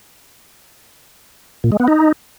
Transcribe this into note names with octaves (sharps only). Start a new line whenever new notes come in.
A#2
G#3
B3
D#4